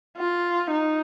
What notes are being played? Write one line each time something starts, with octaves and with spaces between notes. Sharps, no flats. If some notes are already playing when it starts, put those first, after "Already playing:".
F4
D#4